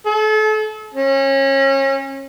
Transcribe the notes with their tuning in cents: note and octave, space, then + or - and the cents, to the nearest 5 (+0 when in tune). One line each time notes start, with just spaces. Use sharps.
A4 -35
C#4 -30